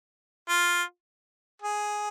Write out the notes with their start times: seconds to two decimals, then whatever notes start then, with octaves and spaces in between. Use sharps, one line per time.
0.49 F4
1.62 G#4